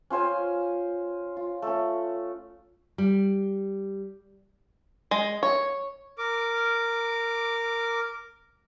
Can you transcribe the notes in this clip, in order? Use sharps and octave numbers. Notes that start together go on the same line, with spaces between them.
C#4 F4 C5 G#5
F4
A3 C#4
G3
G#3
C#5
A#4 D6